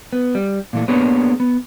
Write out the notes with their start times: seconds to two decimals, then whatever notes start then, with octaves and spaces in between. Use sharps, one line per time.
0.13 B3
0.35 G3
0.73 A#2 E3 A3
0.88 A#3 B3 D4 G#4 B4 C#5
1.40 B3